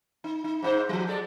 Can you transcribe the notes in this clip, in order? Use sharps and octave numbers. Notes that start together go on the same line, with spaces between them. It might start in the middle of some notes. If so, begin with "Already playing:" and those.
D#4
D#4
G#2 D#4 C5
F3 G3
G#3 A4 D5